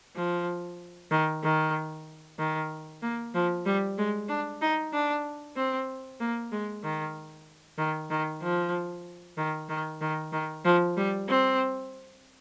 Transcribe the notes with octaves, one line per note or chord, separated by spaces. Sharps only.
F3
D#3
D#3
D#3
A#3
F3
G3
G#3
D4
D#4
D4
C4
A#3
G#3
D#3
D#3
D#3
F3
D#3
D#3
D#3
D#3
F3
G3
C4